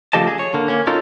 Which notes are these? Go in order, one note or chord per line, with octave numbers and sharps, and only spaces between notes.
C#3 F3 A3 G4 D#5 A5
G#4
C#5
D3 A#3
A#3 C#4
C#4 D#4 F4 A4 A#4